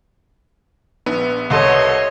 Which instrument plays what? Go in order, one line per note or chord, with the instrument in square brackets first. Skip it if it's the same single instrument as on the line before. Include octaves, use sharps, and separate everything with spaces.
[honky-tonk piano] A#1 [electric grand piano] B3
[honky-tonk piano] C2 A4 [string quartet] C#5 D#5 C6